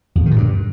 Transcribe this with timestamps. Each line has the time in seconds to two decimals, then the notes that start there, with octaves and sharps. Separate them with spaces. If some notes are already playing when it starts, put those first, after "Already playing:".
0.15 F2
0.21 G#2
0.26 D#3
0.31 A#2
0.36 G2